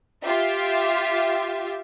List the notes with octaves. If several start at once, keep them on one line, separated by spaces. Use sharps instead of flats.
F4 G4 E5